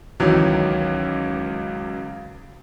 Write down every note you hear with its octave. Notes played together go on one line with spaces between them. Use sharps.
C#2 D#3 E3 F#3